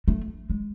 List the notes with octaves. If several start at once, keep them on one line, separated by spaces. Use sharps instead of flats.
A3
G#3